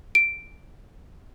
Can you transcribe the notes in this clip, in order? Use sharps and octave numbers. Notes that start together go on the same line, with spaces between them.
D7